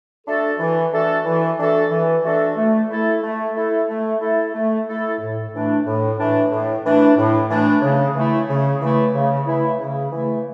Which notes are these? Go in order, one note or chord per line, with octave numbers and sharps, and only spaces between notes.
A3 D4 F#4 A4
E3
A3 D4 F#4 A4
E3
A3 D4 F#4 A4
E3
A3 D4 F#4 A4
A3
E4 A4
A3
E4 A4
A3
E4 A4
A3
E4 A4
A2
E3 A3 D4
A2
E3 A3 D4
A2
E3 A3 D4
A2
E3 A3 D4
C#3
E3 A3 E4
C#3
E3 A3 E4
C#3
E3 A3 E4
C#3
E3 A3 E4